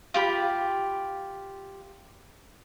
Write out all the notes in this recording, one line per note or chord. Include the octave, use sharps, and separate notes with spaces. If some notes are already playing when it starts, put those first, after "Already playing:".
F4 G4 B5